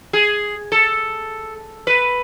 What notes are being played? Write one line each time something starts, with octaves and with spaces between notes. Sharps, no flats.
G#4
A4
B4